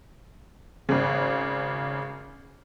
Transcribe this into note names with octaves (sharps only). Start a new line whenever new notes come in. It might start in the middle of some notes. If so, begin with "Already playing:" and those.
G#1 C#3